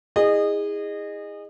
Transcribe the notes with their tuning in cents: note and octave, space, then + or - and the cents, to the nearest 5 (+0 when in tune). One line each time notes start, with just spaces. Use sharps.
E4 -35 G#4 -20 D#5 -25